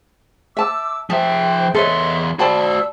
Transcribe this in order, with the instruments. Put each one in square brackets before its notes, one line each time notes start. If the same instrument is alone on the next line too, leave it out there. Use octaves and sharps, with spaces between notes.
[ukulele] E5 A5 [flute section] D6 E6
[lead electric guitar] F3 E5 [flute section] G#4 C5 G5 [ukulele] A5
[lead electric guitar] E2 C6 [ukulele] A4 B4 C#5 [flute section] D#5 E5
[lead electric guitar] F#4 C5 [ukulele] D5 A5 B5 [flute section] E6